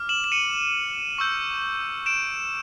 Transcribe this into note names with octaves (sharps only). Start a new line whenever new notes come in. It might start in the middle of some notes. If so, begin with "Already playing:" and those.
Already playing: D6 F6
E7 F#7
E7
C#7 D#7
C#6 E6 G6
D7 E7